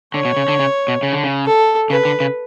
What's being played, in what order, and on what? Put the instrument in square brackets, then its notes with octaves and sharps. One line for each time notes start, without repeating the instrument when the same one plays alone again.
[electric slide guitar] D3 [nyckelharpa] C#5
[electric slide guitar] B2
C#3
D3
C#3
B2
C#3
D3
C#3
[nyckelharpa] A4
[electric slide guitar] C#3 [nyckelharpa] B4
[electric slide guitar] D3
C#3